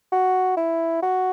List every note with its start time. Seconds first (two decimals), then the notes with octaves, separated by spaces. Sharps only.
0.12 F#4
0.57 E4
1.02 F#4